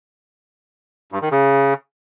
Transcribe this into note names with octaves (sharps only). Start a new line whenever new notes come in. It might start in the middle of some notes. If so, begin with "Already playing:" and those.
G2
D#3
C#3